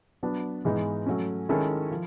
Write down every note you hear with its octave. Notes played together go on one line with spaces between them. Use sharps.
F#3 B3 D4
G#2 E3 G#3 B3 D#4
F#3 A3 C#4
D#3 G#3 C#4 E4 A4
F3